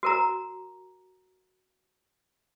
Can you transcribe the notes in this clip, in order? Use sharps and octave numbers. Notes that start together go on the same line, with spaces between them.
F#4 A#4 A#5